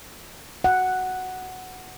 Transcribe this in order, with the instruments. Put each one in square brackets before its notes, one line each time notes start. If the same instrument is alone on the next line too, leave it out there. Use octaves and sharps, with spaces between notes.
[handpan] F#5